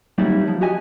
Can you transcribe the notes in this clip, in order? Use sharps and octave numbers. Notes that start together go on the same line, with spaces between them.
F#3 G3 A#3 C4 D#4 E4
F3
F#4 G4 D#5 G#5